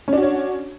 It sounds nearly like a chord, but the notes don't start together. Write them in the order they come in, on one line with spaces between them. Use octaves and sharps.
C#4 D4 F#4 C#5